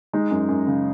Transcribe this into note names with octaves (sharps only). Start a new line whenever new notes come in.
G#3 D#4
F#2
F#2
C#3